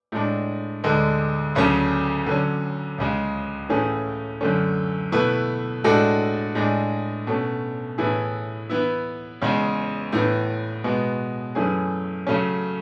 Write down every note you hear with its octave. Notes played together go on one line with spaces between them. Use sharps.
A2 G#3 D4
D2 D3 G#3
D2 C#3 F#3 A3 C#4
D3 F#3 C#4
C#2 C#3 G#3
A2 E3 A3 C#4 G#4
F#2 D3 A3 C#4
B2 A3 E4 B4
A2 G#3 D4 F#4 A4
A2 G#3 D4 G#4
B2 A3 C#4
A2 E3 B3 E4 G#4
E3 B3 E4
E2 C#3 G#3
A2 E3 B3
B2 G#3 B3 F#4
F#2 E3 A3 C#4 G#4
C#3 F#3 A3 C#4